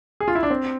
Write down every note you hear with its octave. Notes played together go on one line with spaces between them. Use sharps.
G#4
F4
E4
D4
C4